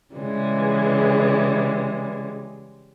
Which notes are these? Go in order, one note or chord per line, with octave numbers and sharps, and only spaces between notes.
C#3 E3 G3 G#3